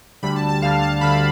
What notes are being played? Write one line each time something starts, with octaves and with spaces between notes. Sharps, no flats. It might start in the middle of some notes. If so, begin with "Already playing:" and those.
D2 D3 G3 B5
A5
A5
D2 D3 G3 F5
A5
D2 D3 G3 B5